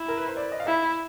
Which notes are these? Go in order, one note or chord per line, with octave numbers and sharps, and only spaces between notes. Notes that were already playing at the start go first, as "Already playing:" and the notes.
Already playing: E4
A#4
B4
C5
D5
D#5
F5
E4 E5